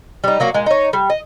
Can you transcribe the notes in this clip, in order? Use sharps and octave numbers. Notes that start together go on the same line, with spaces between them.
G3 D#4
F#3 A#3 F#4
A#2 G#3
D#4 C#5
G3
D#5